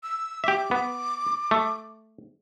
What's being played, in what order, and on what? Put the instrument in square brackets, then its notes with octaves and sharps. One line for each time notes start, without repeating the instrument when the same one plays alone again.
[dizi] E6
[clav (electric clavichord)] G4 E5 [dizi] D6
[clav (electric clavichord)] B3
A3